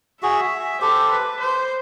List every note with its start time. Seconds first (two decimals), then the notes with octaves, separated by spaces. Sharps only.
0.22 F#4 G#4 E5
0.81 G4 A4 C5
1.11 B4
1.40 C5